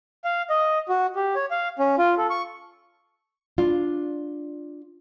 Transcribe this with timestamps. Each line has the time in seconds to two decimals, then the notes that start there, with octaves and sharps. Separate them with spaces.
0.25 F5
0.50 D#5
0.89 F#4
1.16 G4
1.35 C#5
1.51 F5
1.79 C#4
1.98 F4
2.17 A4
2.30 C#6
3.58 D4 F4